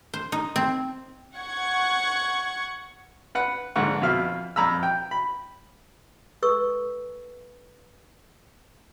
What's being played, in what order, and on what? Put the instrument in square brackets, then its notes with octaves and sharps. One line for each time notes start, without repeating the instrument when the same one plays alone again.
[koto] C5
D#4
C4
[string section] F#5 C#6 G#6
[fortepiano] B4 F#5 F#6
A#1 G#2 D3 F#5 C#6
F2 B2 F4 E5 F5 F6
F2 A#5 B5 E6
G5
B5
[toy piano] A4 B4 C#6 E6